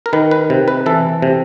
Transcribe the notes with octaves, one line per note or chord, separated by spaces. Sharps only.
A#4
D#3 B4
B4
C3
B4
E3 A4
C3